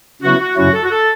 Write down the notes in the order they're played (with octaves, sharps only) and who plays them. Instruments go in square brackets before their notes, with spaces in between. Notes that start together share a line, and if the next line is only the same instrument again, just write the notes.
[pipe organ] C#3 F#3 B3 E4 [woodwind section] F#4
[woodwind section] F#4
[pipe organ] F#2 C#3 F#3 C#4 E4 [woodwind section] F#4
[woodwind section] A4
F#4
A4